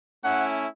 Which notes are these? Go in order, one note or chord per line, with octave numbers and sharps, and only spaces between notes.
A3 C#4 E4 F#5